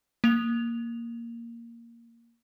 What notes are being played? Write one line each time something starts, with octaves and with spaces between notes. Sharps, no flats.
A#3 F7